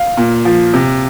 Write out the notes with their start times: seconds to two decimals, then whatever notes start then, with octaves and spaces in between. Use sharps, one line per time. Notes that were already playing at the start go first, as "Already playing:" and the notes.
Already playing: F5
0.17 A#2
0.45 F3
0.74 C3